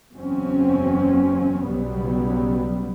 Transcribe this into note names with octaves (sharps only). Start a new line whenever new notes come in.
F#1 E2 F#3 C4 C#4
B1 C#3 F#3 G3 B3